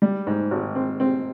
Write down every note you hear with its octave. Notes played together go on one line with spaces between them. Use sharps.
G3
G#2
G#1
C4
C4